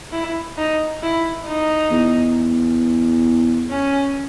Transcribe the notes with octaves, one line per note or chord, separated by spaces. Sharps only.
E4
D#4
E4
D#4
E2
C#4